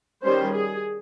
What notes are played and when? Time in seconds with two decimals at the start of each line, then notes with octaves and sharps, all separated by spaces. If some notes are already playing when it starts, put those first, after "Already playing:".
0.24 D#3 G3 C#4 C5
0.52 G#4